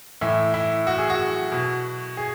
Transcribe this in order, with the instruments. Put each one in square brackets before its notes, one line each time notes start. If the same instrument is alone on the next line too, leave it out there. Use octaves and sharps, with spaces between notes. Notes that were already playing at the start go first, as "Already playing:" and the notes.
[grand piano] A2 E3 E4
E4
F#4
G#4
F#4
B2
G#4